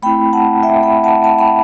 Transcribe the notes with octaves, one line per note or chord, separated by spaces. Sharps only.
A3 C4 E4 G5 B5
F#5 A5
E5 G5
G5 B5
F#5 A5
F#5 A5
G5 B5